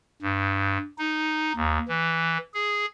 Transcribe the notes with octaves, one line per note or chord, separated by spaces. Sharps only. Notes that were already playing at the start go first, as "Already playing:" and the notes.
G2
D#4
D#2
E3
G#4